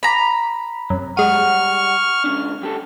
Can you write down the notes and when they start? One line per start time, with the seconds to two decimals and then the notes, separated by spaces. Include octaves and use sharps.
0.03 A#5 B5
0.90 F#2 C3
1.17 G3 G#3 F#5 C#6 F6 D#7
2.24 C#2 C#4 D4
2.62 F#2 G4 A4